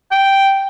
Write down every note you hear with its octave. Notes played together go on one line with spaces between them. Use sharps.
G5